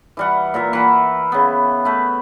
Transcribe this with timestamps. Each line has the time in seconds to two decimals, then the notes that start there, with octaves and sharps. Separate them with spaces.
0.17 E3 G3 F#5
0.54 A#2 A#4 E5
0.73 E3 F#5
1.32 C#3 B3
1.85 A3 B4